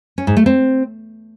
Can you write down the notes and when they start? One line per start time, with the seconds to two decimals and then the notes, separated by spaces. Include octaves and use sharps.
0.18 C#4
0.27 G#2
0.37 A3
0.46 C4